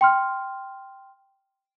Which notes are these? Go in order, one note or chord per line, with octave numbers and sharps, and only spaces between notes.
G5 C6 F6